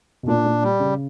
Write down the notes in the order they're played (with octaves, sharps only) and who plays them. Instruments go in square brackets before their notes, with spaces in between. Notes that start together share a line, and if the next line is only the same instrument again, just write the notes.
[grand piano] B2
[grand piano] A#2 [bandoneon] D4
[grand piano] A#2
[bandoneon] G3
[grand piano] C#3